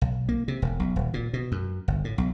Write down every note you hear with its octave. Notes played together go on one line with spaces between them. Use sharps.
B1
A#3
C3
E1
B1
D#1
A#2
B2
F#2
G1
A2
B1